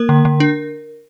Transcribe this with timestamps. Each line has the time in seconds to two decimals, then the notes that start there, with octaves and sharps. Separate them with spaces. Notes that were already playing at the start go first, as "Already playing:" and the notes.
Already playing: A#3 A#4
0.09 D3
0.25 D3
0.40 D4